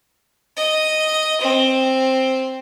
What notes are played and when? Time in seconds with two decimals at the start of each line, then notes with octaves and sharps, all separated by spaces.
0.57 D#5
1.41 C4